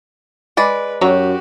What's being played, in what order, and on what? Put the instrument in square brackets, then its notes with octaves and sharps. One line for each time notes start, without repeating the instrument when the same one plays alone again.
[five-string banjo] G#3 D5 B5 [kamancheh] B4
[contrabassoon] F#2 [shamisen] F#3 C#5 A#5 [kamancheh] F#4 G4